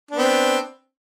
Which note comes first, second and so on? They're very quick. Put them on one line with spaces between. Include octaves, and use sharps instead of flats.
D4 B3 C4